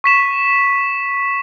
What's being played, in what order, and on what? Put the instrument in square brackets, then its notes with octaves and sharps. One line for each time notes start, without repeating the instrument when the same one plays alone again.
[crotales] C#6 B6 E7